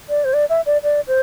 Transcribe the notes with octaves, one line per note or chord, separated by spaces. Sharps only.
D5
C5
D5
E5
D5
D5
C5